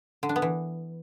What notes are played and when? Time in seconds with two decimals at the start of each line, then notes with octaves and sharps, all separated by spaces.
0.23 D3
0.29 D4
0.36 B3
0.42 E3